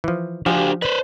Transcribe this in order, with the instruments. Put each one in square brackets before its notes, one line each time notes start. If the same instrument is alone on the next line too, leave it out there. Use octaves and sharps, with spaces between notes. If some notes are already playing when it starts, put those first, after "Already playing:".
[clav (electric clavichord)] E3 F3
[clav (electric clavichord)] F3 [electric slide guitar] D4 F#4 C5 [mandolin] G4 F5 G#5
[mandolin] D4 [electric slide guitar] B4 C5